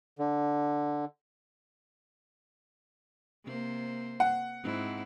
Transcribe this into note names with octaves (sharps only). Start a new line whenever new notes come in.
D3
C3 A#3 C5
F#5
G#2 C4 E4